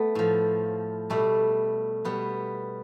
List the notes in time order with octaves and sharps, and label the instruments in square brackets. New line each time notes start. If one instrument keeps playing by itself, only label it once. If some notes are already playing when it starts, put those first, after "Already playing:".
Already playing: [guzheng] A3 B3
A2 F3
B2 G3 A3
B2 G3 B3